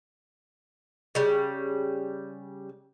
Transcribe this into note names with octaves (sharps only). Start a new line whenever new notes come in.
C#3 G3